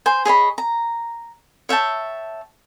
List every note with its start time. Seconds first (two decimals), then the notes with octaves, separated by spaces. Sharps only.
0.06 C5 G#5
0.25 G#4 C#5 D#5 B5
0.58 A#5
1.69 C#5 E5 G5 A5